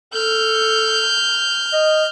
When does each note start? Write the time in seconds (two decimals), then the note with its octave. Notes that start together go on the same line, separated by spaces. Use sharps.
0.14 A4 F6 G6
1.73 D#5